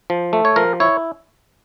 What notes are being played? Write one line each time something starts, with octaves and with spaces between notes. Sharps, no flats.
F3
A3
C#5
F3 A#4
E4 C#5